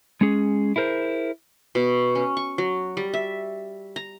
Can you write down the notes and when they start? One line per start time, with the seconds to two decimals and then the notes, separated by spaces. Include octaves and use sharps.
0.21 G#3 C#4 G#4
0.76 E4 G#4 A#4 C5
1.75 B2
2.15 C#4
2.37 C#6
2.58 F#3
2.97 G3
3.14 E5
3.96 A#5